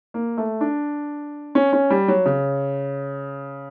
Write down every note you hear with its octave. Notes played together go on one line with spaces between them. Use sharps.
A#3
A3
D4
C#4
C#4
G3
F#3
C#3